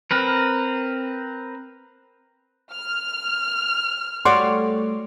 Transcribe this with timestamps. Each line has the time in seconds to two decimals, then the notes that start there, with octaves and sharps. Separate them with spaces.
0.11 C4 A#4 B4
2.74 F6
4.25 G3 A3 F#4 G4 C#5 D5 C6